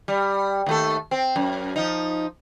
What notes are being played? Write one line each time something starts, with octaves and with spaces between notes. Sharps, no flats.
G3
D#2 A3 A4
C4
F#2
F3 D#4